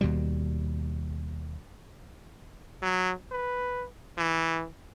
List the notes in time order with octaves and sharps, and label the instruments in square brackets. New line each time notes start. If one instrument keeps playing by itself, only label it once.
[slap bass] D#2 B2 G3
[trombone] F#3
B4
E3